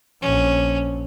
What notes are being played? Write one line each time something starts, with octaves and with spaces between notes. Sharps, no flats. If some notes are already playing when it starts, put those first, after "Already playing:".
A#1 C#4